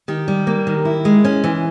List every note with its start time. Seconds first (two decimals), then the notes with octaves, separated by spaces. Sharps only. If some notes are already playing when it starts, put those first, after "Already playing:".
0.08 D#3 G4
0.28 G3
0.47 A#3
0.67 D#3
0.85 E4
1.05 G#3
1.25 C#4
1.44 E3